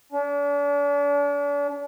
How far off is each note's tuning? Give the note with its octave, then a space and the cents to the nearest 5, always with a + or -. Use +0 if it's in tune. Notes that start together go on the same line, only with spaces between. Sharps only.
D4 -40